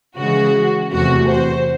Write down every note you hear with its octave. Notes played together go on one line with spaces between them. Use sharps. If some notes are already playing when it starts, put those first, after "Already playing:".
C#3 E3 G#3 F#4
E2 C3 E3 A3 F#4
C5